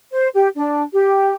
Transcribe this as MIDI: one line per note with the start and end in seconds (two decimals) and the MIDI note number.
0.11 0.27 72
0.34 0.48 67
0.55 0.82 62
0.92 1.33 67